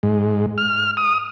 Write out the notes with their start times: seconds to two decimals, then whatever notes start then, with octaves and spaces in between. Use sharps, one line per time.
0.03 G#2
0.58 F6
0.97 D#6